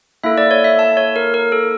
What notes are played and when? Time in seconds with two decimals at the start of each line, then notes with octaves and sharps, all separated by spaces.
0.24 A#3 E4 A4 E5
0.38 D5
0.51 C#5
0.64 E5
0.79 A5
0.97 C#5
1.16 A#4
1.34 A#4
1.52 A4